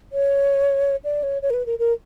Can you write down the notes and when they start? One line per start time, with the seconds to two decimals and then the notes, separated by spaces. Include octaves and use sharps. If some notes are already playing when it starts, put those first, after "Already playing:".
0.12 C#5
1.04 D5
1.23 C#5
1.42 C#5
1.50 A#4
1.54 B4
1.66 A#4
1.79 A#4